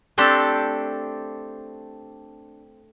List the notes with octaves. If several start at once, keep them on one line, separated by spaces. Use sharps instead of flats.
A3 C4 D4 G4 A4